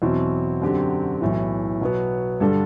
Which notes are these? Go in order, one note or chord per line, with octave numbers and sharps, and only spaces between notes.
E2 B2 F#3 C4 E4
F#2 D3 F#3 C4 G4
B1 A2 E3
B2 F#3 B3
G2 D3 G3 D4 A4